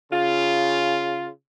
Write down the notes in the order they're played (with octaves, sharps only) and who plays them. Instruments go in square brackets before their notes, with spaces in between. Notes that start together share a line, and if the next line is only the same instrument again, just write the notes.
[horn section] C#3 F4